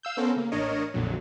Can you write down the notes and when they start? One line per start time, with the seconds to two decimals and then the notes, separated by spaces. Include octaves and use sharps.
0.03 F5 E6 G6
0.17 B3 C#4 A4 A#4 C5
0.36 C#3 A#3
0.52 A1 D4 A#4 C#5 D#5
0.94 A#1 F2 A#2 D3 F#3